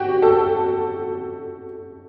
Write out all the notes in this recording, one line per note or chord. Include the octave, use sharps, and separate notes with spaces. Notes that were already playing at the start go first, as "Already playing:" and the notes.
Already playing: F#4 G4
A4